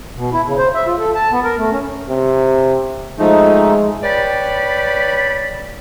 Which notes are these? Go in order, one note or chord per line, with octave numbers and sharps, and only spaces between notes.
B2
E4
C#3
C5
E5
F4
A4
A5
B3
A#4
A3
C#4
C3
F3 G#3 A3 D#4
B4 C#5 D5 G5 A5 B5